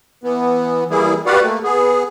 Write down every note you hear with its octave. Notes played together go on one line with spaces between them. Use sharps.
E3 B3
E3 G3 A#3 E4 G#4
F#4 G4 B4 D5 F5 F#5
A3 A#3
B3 G#4